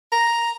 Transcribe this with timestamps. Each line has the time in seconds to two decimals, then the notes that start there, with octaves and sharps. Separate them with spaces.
0.12 A#5